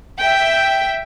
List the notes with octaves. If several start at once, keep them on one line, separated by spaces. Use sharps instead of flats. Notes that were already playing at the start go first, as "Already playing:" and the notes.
E5 G5